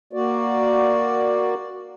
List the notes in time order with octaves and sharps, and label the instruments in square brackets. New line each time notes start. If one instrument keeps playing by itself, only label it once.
[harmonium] A#3 F#4 D5